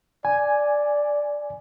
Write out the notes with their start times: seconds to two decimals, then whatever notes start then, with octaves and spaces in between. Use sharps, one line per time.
0.25 D5 G#5